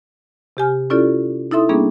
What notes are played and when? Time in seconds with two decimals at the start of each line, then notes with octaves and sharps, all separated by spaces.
0.57 C3 G4 G#5 F6
0.90 C#4 E4 F4 G4 A4 D5
1.51 D#4 E4 A4 E5 C6 D#6
1.69 G3 A#3 B3 C#4 D4 G#4